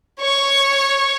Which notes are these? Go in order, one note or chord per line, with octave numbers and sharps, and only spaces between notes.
C#5 C#6